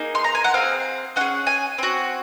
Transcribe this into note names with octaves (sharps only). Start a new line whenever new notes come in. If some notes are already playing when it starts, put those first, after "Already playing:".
Already playing: A#3 D#4 G#4
C6
A#5
G#5
F#5
C4 F4 G#4 F5
C#4 G#4 F#5
G#5
C4 F#4